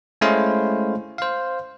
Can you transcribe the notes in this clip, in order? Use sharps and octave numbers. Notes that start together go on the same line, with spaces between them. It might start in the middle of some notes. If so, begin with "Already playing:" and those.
G#3 A3 C#4 E4 C5 F5
C5 F5